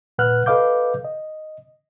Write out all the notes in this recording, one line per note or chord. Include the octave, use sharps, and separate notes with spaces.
D#2 A#2 B4 F#5 F6 F#6
A4 B4 D#5 F5 D6 G6
D#5